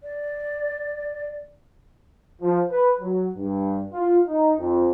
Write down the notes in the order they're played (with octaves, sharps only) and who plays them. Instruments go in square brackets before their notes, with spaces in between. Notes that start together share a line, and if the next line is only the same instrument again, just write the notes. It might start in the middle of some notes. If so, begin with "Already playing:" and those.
[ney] D5
[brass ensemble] F3
B4
F#3
G2
F4
D#4
F2